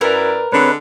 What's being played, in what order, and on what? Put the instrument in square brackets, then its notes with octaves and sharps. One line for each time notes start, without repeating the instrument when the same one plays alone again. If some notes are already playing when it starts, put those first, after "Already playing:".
[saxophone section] F#2 E4 D5 [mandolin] A#4 [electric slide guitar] B4
[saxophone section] D3 G#3 [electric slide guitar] C4 C#5 [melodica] B4